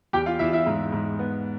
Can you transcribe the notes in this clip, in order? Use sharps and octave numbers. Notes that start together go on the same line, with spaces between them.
E2 G4 G5
F4 F5
E2 E4 E5
E4 E5
G#2
G#2
B3